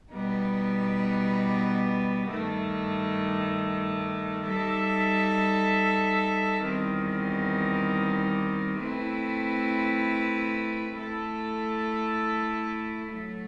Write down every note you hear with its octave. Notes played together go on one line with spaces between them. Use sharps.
B2 G3 B3 D#4
G2 D#3 A3
G3 D#4 A4 E5
E2 D#3 G3 C4 D#4
A3 C4 E4 B4
A3 E4 A4
A2 F#3 A3